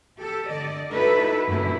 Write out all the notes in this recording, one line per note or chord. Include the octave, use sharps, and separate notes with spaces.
G4 A4
D3 D5 D#5
D#4 E4 F#4 A4 B4 E5
F#2 A#2 D3 G3 A3 E4